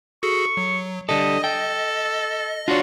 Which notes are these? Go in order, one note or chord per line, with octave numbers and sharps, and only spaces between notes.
F#4 G#4 A4 C#6
F#3
D3 G3 A4 D#5 D#6
A4 G5
D4 F4 F#4 C#5 D5 C6